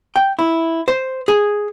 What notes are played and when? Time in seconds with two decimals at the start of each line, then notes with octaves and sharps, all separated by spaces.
0.16 G5
0.39 E4
0.88 C5
1.28 G#4